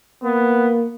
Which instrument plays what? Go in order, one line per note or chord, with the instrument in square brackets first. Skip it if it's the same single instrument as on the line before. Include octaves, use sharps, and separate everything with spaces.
[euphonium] A#3 [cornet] B3